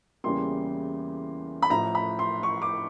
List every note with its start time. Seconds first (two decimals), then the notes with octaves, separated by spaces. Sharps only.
0.24 E2 C#3 E3 G3 A#3 C6
1.62 B5
1.70 A1 A2 F3 A#5
1.95 B5
2.19 C6
2.43 C#6
2.62 D6